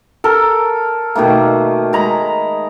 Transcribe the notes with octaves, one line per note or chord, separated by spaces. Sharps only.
A4 A#4
B2 D#3 A3 A#3
G#3 A#5 B5